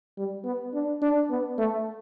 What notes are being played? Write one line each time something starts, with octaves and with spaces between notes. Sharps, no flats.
G3
B3
D4
D4
B3
A3